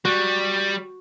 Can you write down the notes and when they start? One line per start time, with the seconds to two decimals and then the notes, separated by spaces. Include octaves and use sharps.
0.05 G3 F#4